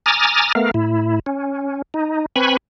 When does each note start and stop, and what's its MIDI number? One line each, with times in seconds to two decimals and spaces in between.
0.06 0.52 80
0.06 0.52 82
0.06 0.52 86
0.06 0.52 87
0.06 0.52 89
0.06 0.52 93
0.55 0.71 57
0.55 0.71 59
0.55 0.71 70
0.55 0.71 77
0.74 1.19 45
0.74 1.19 64
1.26 1.82 61
1.94 2.26 63
2.36 2.57 60
2.36 2.57 71
2.36 2.57 80
2.36 2.57 83
2.36 2.57 85